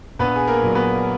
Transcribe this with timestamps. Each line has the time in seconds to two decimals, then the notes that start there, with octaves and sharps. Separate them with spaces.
0.19 A#1 B3 B4
0.36 G#4
0.47 A#3 A#4
0.61 A#2 F#3
0.75 B3 B4